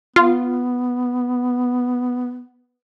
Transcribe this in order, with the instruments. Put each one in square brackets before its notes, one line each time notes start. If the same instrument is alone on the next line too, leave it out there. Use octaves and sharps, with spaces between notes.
[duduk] B3 [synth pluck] F4